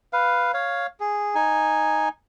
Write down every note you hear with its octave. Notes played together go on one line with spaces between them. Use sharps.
B4 F5
C#5 F5
G#4
D#4 G#5